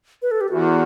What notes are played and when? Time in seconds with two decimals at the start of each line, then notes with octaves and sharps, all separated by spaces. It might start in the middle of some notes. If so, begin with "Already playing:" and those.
0.22 B4
0.31 A4
0.41 G4
0.50 E2 F#4